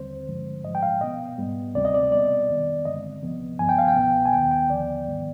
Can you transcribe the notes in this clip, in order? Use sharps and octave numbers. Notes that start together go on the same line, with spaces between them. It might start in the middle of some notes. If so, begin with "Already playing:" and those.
Already playing: D#2 D3 G3 C4 C5
G2 D3 F3 G#3
G#2 F3 G#3 D#5
G5
F5
B2 B3 D#5
G#2 G3 B3
D2 C3 G3 C4 D5
D#5
D5
B2 G3 B3 D5
F2 D#3 B3
G2 D3 G#3 C4 D#5
C2 C3 F3 B3
G2 F3 B3 G#5
G5
F5
G5
C2 B2 B3
G#5
D#2 D#3 B3 G5
G5
D#2 D3 F3 B3 D5
G#2 D#3 G3 B3